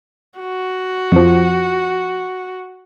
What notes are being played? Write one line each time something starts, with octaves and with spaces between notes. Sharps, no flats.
F#4
F2 F3